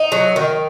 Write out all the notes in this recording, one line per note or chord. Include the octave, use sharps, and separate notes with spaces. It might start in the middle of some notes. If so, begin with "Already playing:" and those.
Already playing: D#4
F#3
D#3